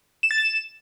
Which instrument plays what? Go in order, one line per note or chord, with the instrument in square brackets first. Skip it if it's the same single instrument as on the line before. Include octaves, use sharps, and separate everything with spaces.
[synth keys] E7
A6
E7